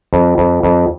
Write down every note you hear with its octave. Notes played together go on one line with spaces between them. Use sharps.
F2
F2
F2